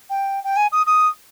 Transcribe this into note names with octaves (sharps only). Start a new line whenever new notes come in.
G5
G5
G#5
D#6
D#6